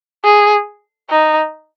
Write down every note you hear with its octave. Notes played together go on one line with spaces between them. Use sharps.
G#4
D#4